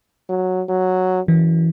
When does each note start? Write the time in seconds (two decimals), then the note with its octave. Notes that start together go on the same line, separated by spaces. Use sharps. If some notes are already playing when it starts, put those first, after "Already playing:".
0.29 F#3
0.69 F#3
1.28 F#2 E3